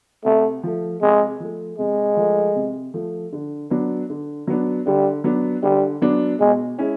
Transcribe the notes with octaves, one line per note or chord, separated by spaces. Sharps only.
C3 A3
F3 A3
C3 G#3
F3 A3
C3 G#3
F3 A3
C3
F3 A3
D3
F#3 B3 D4
D3
F#3 B3 D4
D3 G3
F#3 B3 D4
D3 G3
F#3 B3 D4
B2 G#3
G#3 C#4 E4